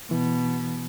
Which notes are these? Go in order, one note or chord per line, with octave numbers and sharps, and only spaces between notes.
B2 E3